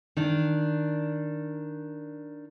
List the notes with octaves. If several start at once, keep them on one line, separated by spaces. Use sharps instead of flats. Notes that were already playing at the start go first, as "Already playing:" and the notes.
D#3 D4